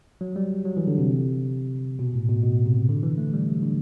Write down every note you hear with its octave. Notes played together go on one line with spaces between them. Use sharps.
F#3
G3
F#3
E3
D3
C3
B2
A2
B2
B2
C3
D3
E3
A3
G3
F#3
D3